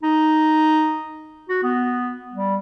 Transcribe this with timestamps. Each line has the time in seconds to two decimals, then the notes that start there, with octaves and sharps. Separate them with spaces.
0.03 D#4
1.49 F#4
1.63 B3
2.33 G3